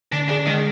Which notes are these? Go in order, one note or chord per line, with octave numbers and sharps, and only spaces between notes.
D3 D4
D4 G#4
D#3 G#3